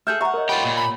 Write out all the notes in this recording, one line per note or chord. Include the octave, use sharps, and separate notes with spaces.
G#4 A4 E5 F6 G6
C#5 E5 F#5 A#5
A#4 D#5
F4 G4 B5
A#2
B5